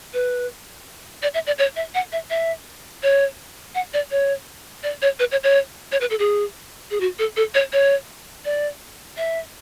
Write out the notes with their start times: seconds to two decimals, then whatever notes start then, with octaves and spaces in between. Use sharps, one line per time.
0.14 B4
1.23 D5
1.34 E5
1.47 D5
1.58 C#5
1.76 E5
1.95 F#5
2.12 E5
2.30 E5
3.03 C#5
3.75 F#5
3.94 D5
4.11 C#5
4.83 D5
5.02 C#5
5.19 B4
5.32 C#5
5.44 C#5
5.92 C#5
6.01 B4
6.10 A4
6.19 G#4
6.91 G#4
7.00 F#4
7.19 A4
7.37 A4
7.55 C#5
7.73 C#5
8.45 D5
9.17 E5